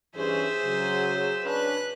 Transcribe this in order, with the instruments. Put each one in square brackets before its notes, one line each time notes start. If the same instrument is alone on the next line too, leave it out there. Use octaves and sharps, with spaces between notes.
[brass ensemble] G2 E3 C#4 [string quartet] G#4 C5 E5
[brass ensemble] C#3 F#3
[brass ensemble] C#4 D4 [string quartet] B4 F#6